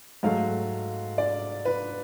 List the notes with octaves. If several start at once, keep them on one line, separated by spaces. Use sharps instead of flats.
G#2 F#3 A3 F5
D5
B4